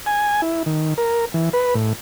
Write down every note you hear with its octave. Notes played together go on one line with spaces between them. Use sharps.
G#5
E4
D#3
A#4
E3
B4
A2